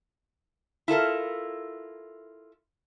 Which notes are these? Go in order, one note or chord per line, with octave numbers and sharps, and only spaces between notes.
E4 F4 A4 A#4